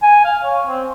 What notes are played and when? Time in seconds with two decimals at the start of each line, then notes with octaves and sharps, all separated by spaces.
0.02 G#5
0.25 F5
0.44 C#5
0.67 C4